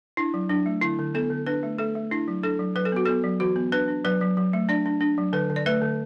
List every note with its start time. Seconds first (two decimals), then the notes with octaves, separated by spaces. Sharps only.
0.17 D4 E4
0.34 F#3
0.50 F#3 D4
0.66 A3
0.81 D3 E4
0.99 D3
1.15 B3 A4
1.30 D3
1.47 D4 B4
1.63 A3
1.78 A3 A4
1.95 A3
2.11 D4 E4
2.28 F#3
2.43 D4 A4
2.59 F#3
2.75 F#3 B4
2.85 A4
2.92 B3 F#4
3.06 B3 A4
3.23 F#3
3.40 E3 F#4
3.56 B3
3.72 D4 B4
3.88 D4
4.05 F#3 B4
4.21 F#3
4.37 F#3
4.53 A3
4.69 D4 D5
4.86 D4
5.01 D4
5.18 F#3
5.33 D3 B4
5.50 D3
5.56 D5
5.66 A3 B4
5.82 D3